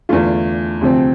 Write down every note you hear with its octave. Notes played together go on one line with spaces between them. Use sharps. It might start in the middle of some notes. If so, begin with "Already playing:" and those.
E2 D3 A3 D4 F4
D2 C3 F3 C4